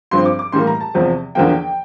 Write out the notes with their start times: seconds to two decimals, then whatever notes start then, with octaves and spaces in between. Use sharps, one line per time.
0.11 G2 F3 C4 C6
0.25 D6
0.39 D6
0.52 A2 E3 G3 A#3 C6
0.67 A#5
0.80 A5
0.94 E2 C3 F3 C4
1.35 E2 D3 F3 A#3 G5